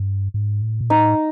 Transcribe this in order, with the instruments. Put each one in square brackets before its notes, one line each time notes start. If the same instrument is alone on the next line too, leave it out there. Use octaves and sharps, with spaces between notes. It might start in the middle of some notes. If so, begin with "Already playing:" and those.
Already playing: [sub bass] G2
G#2
A2
A#2
[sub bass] A2 [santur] D#4